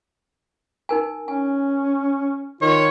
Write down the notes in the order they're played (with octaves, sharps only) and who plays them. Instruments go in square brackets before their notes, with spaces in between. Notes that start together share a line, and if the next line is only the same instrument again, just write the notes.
[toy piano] D#4 A#4 G#5
[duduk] C#4 [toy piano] G#5
[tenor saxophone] D#3 [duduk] F4 [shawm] C#5